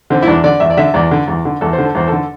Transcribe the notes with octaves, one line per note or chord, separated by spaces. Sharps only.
D3 C4
E4
E2 D4
D3 D5
E2 E5
D5
D3 E5
E2 D5
D3
E2
D3
E2 A4
C5
D3
A4
E2 C5
D3 A4